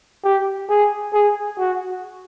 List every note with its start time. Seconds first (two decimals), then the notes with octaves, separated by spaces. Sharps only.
0.24 G4
0.70 G#4
1.14 G#4
1.58 F#4